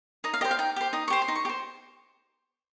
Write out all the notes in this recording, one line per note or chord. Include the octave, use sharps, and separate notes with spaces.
D#4 D#5
F5
G4 C5 D#5
F5
D#4 G5
G4 C5
D#4 D#6
G4 C5 C#6
C6
D#4
C#6
G4
C5